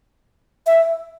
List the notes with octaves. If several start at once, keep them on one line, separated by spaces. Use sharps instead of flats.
E5